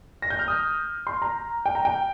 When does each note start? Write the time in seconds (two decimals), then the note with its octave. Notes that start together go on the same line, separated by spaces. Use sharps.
0.22 A#6
0.30 G6
0.39 F6
0.48 D#6
1.07 C6
1.22 A#5
1.66 G5
1.75 A#5
1.85 G5